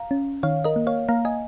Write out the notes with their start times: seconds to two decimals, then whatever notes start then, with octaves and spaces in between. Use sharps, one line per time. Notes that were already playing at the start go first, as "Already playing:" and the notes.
Already playing: F5 A#5
0.11 C#4
0.43 D#3 C#5 F5
0.64 A#4 D#5
0.76 A#3
0.87 C#5 F5
1.09 A#3 F5 A#5
1.25 D#5 G#5